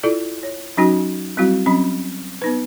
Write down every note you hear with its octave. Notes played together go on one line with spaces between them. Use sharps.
E4 F4 A4 D5
C#5
F#3 C#4 D#4 F#4 G#5
F#3 G3 C4 E4 F#4 F5
F#3 C4 C#4 B5
B3 D#4 B4